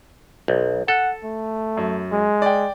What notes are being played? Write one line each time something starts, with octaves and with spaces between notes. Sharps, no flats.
B1
A4 F#5
A3
F#2
G#3
D5 G5